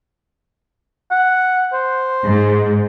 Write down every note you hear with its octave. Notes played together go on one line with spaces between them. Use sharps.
F#5
C5
G#2